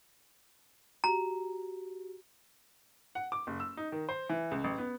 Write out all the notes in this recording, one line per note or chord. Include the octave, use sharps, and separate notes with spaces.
F#4 G4 A#5
F#5
D6
F#1
E6
D#4
D#3
C5
E3
C#2
A1
B3